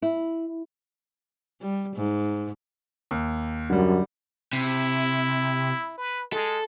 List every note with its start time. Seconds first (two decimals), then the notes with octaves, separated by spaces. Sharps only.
0.02 E4
1.61 G3
1.96 G#2
3.11 D#2
3.70 F#2 D3 G3
4.53 C3 E4
5.98 B4
6.33 G#3 A4